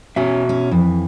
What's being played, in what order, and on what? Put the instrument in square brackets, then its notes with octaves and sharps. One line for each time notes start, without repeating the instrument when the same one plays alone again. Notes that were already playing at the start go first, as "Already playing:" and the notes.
[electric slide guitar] B2 F#4 E5 [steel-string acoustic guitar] C#4
[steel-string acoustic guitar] C#4
[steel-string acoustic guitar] F2 [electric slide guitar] E3